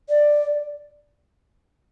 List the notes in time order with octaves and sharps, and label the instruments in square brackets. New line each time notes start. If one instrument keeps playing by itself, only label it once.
[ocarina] D5